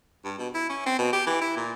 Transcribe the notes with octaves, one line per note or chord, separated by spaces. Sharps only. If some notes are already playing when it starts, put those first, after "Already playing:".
G2
B2
E4
C#4
C4
B2
G4
E3
E4
A#2